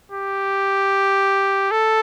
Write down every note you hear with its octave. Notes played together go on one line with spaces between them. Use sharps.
G4
A4